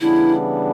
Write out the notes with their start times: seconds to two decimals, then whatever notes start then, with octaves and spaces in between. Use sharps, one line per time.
0.01 C#3 E3 G3 B3 D4 E4